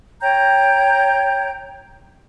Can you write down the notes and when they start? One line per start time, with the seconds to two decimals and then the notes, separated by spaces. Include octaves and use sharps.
0.21 C#5 G5 A#5 G6